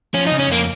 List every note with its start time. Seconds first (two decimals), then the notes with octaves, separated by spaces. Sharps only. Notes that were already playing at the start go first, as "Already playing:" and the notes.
0.14 F3 C#4
0.27 D#4
0.31 C#3
0.39 C#4
0.47 F2 A#3